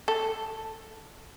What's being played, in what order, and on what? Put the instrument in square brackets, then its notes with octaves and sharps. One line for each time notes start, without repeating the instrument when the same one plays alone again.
[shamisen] A4